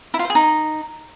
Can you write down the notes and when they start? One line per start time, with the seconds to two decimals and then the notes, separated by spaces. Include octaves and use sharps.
0.14 E4
0.19 F4
0.24 C5
0.30 G#4
0.35 D#4